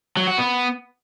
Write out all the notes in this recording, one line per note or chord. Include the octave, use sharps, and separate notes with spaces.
F#3
F#4
B3